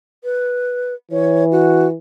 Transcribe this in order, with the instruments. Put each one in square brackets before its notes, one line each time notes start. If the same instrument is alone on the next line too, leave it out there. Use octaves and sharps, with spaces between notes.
[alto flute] B4
[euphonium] E3 [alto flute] C#5
[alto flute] F#4